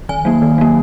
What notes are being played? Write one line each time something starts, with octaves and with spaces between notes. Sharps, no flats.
D#3 G#5
F#3 A#3
D#3
F#3 A#3